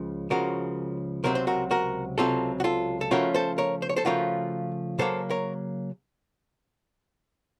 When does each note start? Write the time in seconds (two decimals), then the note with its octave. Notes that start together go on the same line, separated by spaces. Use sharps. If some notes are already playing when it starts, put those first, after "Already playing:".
Already playing: C#2 C#3 F3
0.30 C#2 C#3 F3 F#4 A#4
1.24 C#2 C3 F#3 C4 A#4
1.35 C5
1.47 F#4 A#4
1.71 F#4 A#4
2.18 C#2 C3 F#3 C4 F4 A4
2.60 F#4
2.64 F4 A4
3.01 A4
3.11 C#3 F3 A3 C#4 F4 F#4 A#4
3.34 A4 C5
3.58 A#4 C#5
3.82 C5
3.89 C#5
3.96 A4 C5
4.05 C#3 F3 A3 C#4 F4 F#4 A#4
4.99 C#3 F#3 A#3 A4 C5
5.30 A#4 C#5